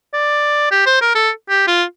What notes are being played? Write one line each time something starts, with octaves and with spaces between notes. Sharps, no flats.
D5
G4
C5
A#4
A4
G4
F4